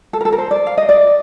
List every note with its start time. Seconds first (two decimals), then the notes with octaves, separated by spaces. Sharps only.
0.13 A4
0.21 A#4
0.25 A4
0.33 A#4
0.38 C5
0.51 D5
0.66 F5
0.78 D#5
0.89 D5